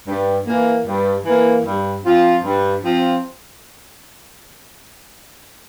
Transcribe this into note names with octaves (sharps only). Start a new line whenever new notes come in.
G2
E3 A#3
G2
E3 A#3
G2
F3 C4 F4
G2
F3 C4 F4